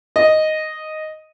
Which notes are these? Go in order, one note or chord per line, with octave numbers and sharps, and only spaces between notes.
D#5